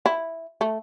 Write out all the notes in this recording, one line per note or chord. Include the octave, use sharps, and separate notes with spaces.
E4
A3